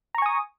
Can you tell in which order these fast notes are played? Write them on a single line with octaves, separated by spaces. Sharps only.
A#5 C#6 G#5 D#6